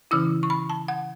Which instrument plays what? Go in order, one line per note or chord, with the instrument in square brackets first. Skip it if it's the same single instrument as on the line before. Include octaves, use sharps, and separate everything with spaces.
[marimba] C#3 E3 C#4 E4 E6
C#6
B5
A5
F#5